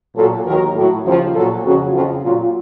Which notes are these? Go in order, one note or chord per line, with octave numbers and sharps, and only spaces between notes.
A#2 F#3 A4
D#2 D#3 F#3 A#4
A2 F#3
D#2 C#3 F3
A#2 F#3 A4
F2 C#3 F#3 F#4
F2 C#3 F3 F4
A#2 F#3 F4